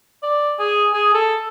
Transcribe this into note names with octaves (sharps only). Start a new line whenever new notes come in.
D5
G#4
G#4
A4